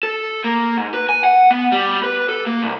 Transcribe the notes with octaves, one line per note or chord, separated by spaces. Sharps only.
A4
A#3
G#2
B4
G#5
F#5
B3
G3
B4
A4
A#3
C2